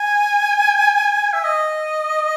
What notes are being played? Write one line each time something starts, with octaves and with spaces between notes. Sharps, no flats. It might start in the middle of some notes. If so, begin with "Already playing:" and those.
Already playing: G#5
E5
D#5